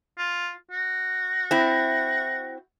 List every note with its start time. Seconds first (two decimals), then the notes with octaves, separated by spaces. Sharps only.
0.18 F4
0.71 F#4
1.51 C4 E4